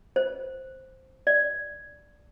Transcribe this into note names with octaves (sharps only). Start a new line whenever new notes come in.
C5
D5